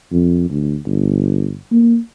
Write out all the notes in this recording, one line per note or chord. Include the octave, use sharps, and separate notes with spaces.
F2
D2
G1
A#3